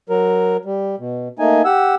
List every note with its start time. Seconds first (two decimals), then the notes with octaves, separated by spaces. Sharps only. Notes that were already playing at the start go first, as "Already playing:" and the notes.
0.10 F#3 A#4
0.65 G3
0.99 B2
1.39 A3 A#3 D#4 G#5
1.65 G4 F#5 E6